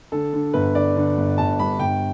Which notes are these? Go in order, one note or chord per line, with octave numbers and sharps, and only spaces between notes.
D3 A4
D3
G1 B4
D3 D5
D3
G1
G1 A5
G2 B5
G1 G5